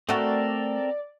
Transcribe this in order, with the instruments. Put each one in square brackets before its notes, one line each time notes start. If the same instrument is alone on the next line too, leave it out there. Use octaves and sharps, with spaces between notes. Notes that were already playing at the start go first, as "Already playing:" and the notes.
[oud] A3 F#4 [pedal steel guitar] C4 A4 A#4 [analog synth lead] D5